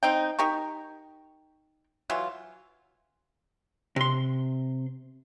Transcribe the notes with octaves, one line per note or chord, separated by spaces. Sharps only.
C4 D#4 G5
D#4 G4 A#4 C#6
E3 F#3 E4 F4
C3 C6